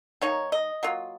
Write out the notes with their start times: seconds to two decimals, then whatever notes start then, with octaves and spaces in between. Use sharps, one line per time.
0.22 D#3 A#3 D#4 C#5
0.52 D#5
0.83 F#3 A#3 F4